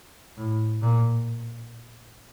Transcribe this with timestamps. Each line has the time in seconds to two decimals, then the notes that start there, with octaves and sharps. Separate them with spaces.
0.37 A2
0.82 A#2